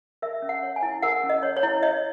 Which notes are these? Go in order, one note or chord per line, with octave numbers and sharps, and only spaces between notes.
A#4 E5
C#4
F#5
C#5
G#5
E4
A#4 F#5
C#4
D#5
C#5
C#5
E4
C#5 D#5